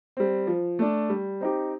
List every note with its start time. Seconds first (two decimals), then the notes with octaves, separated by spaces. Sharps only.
0.17 G3 C4
0.47 F3
0.79 A3 D4
1.10 G3
1.41 C4 D#4 G4